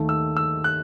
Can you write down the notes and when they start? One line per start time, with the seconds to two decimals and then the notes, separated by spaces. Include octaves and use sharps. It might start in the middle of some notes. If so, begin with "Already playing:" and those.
Already playing: D#2 D#3 A3
0.09 E6
0.37 E6
0.64 F#6